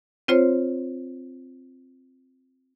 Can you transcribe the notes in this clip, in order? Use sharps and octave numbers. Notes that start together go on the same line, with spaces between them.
C4 F4 C5 C#5